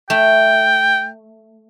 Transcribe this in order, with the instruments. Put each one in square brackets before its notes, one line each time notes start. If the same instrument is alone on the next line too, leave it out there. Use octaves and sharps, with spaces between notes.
[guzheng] A3 [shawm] G5